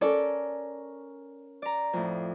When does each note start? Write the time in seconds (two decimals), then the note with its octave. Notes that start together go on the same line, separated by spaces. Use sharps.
0.01 C#4 A4 A#4 D5
1.62 D5 A#5
1.93 F2 A2